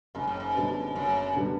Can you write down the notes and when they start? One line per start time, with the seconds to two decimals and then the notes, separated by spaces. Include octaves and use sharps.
0.15 F#1 G#2
0.27 A2
0.40 G#2
0.54 F#2 D3 G3 B3
0.95 F#1 F#2
1.36 D3 G3 B3